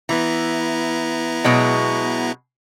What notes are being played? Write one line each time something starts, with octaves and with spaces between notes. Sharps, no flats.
E3 B3 E4 A#5
B2 F#3 G#3